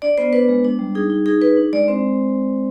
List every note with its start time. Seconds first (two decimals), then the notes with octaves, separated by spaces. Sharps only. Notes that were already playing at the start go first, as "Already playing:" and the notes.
0.02 D4 D5
0.18 B3 C5
0.33 D4 B4
0.49 G#3
0.65 D4
0.79 G3
0.95 D#4 G#4
1.10 D#4
1.26 D#4 G#4
1.41 D#4 B4
1.57 D4
1.73 G#3 D5
1.88 C4 C5